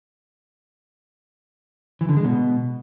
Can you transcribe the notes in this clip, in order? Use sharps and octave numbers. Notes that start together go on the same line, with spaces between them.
E3
D3
G#3
B2